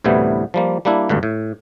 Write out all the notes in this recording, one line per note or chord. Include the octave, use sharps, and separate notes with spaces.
D2 A2 C3 E3 G3 B3
F3 G3 A#3
G3 A#3 D4 E4
G#1 D2 G2 D3
A2